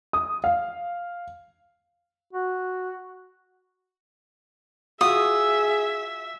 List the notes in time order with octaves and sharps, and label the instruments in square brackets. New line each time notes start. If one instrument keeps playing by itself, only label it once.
[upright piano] D#6
F5
[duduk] F#4
[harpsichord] F4 F#4 [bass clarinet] G#4 [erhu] E5 [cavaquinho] D#6